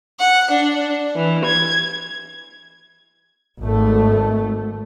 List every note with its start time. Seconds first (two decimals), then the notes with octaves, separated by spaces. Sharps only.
0.19 F#5
0.50 D4
1.16 E3
1.45 G#6
3.62 G#1 A3